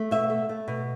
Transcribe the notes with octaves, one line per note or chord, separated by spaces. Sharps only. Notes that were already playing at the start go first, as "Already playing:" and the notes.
Already playing: A3
B2 E5
A3
A3
B2